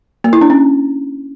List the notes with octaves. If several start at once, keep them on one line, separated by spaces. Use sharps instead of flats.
A#3
E4
D4
C#4